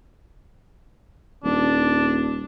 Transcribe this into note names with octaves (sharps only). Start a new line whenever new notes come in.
D#1 D4